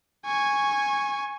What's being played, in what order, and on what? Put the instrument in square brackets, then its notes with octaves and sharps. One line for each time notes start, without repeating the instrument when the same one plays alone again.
[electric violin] G#5 C#6